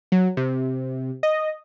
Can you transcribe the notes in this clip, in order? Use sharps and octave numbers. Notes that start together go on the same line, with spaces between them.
F#3
C3
D#5